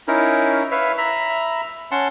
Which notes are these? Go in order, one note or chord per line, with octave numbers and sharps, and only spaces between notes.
C#4 D#4 E4 A#4
B4 C#5 E5 F5
E5 A#5 B5
C#4 F#5 A5 C6